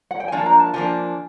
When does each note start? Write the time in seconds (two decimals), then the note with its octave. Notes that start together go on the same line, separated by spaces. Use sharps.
0.11 F#5
0.20 G5
0.28 G#5
0.32 F3 A#3 D4 A5
0.46 A#5
0.60 A5
0.73 F3 A#3 D4 G#5